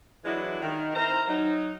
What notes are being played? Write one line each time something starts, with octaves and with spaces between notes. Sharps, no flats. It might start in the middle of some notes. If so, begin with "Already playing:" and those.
E3 F#3 G#3 D4 E4 F#4
D#3
C4 E4 A#4 C5 A#5
F#3 D#4